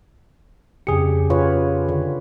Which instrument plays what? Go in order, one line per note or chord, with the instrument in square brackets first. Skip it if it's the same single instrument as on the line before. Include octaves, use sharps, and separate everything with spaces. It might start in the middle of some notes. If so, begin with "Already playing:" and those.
[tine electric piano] F2 G#4 C#7 [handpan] C#3 G4
[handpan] F4 B4 C#5
D3